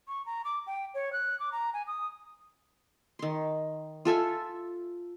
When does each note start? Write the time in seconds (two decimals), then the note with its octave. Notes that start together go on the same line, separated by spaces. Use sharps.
0.08 C#6
0.26 A#5
0.45 D6
0.67 G5
0.94 C#5
1.13 F#6
1.40 D6
1.52 A#5
1.74 G#5
1.87 D#6
3.19 D#3 C6
4.05 F4 A4 E5 G#5